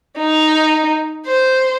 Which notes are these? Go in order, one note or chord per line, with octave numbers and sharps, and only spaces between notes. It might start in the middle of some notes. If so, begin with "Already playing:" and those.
D#4
C5